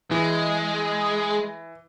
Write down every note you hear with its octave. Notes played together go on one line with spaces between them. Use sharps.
E3 G#3